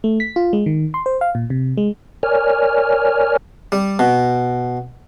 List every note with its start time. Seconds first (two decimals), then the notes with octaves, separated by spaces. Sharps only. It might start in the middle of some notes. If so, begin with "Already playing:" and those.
0.04 A3
0.20 B6
0.36 F4
0.53 G#3
0.66 D#3
0.94 C6
1.06 C5
1.21 F5
1.35 A#2
1.50 C3
1.77 G#3
2.23 A#4 C#5 D5 G#5 F6
3.72 G3
3.99 B2